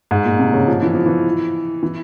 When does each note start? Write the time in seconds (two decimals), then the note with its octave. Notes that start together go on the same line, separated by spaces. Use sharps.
0.11 G#2
0.25 A#2
0.39 C3
0.53 C#3
0.67 F3
0.83 E3
0.94 F3
1.06 E3
1.83 E3